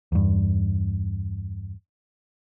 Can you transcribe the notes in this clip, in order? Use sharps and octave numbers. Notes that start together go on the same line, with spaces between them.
E2 G2